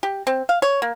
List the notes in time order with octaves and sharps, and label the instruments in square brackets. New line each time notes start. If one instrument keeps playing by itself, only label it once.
[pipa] G4
C4
F5
C#5
A#3